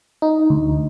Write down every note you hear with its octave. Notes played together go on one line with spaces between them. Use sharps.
D#4
D2